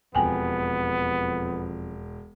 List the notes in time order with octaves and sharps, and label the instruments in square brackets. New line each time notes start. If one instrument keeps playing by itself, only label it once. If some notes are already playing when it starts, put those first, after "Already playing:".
[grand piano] E1 [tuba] F2 [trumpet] B3 [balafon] G5 G#5